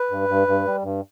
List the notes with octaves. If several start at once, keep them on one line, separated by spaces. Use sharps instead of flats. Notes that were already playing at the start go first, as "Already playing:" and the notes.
Already playing: B4
G2
G2
G2
G3
G2